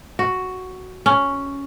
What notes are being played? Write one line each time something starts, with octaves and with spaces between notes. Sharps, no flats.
F#4
C#4